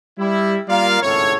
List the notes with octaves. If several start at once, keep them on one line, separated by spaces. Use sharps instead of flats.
G3 E4
G3 A#3 F4 A#4 D5 F5
G#1 C#2 A2 A4 C#5